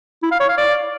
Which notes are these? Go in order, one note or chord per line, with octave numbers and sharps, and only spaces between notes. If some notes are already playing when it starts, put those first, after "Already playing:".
E4
F5
C#5
F5
D5